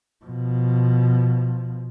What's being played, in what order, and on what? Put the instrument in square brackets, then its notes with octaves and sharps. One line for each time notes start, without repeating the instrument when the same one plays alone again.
[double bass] B2 F3